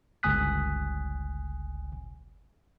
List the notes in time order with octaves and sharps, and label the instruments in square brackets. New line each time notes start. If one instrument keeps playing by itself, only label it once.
[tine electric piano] G1 C#2 G#5 D#6 F#6 B6